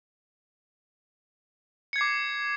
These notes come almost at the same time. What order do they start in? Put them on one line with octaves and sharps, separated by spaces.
C#7 G#6 C7 D6